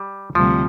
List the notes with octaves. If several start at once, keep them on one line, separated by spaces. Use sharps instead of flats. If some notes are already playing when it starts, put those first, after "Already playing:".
Already playing: G3
D2 C3 F3 G3